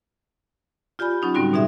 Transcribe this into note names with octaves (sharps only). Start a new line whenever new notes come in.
F4 G4 D5 G#5 B5
F#3 C#4 D#4 F4
A2 D3 G3 C4 D#4 F#4
B2 D#4 G#4 E5